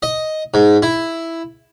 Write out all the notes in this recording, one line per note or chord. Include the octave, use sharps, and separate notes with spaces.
D#5
G#2
E4